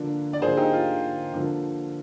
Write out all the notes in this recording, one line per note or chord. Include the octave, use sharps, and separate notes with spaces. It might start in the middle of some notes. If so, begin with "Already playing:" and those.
Already playing: D3 F3 A#3 D4
D5
D3 F3 A#3 G#4 C5
D#4 G4
F4
D3 F3 A#3